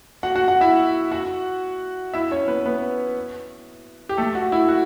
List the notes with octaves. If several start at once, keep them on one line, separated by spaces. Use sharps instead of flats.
F#4 F#5
F#4 F#5
F#4 F#5
E4 E5
F#4 F#5
E4 E5
C#4 C#5
B3 B4
B3 B4
G4
A3 A4
F#4
E4
F#4